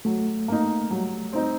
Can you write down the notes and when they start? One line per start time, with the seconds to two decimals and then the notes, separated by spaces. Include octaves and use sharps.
0.05 F#3 A3
0.48 A#3 D#4
0.91 F#3 G3
1.33 C4 D#4